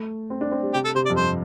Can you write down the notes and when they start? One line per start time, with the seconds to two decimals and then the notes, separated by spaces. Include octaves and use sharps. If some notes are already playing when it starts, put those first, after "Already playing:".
Already playing: A3
0.30 C4
0.41 D4
0.51 C4
0.62 G3
0.74 C3 G4
0.85 A4
0.95 C3 C5
1.05 D5
1.10 F2
1.17 G2 C5